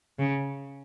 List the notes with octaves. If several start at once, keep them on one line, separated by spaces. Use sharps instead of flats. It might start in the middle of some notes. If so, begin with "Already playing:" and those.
C#3